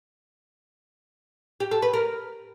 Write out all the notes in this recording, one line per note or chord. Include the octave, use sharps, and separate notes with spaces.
G4
A4
B4
A#4